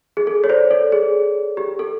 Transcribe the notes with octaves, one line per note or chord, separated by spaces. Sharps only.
G#4
A4
C#5
C5 D5
A4
G#4
G4
A4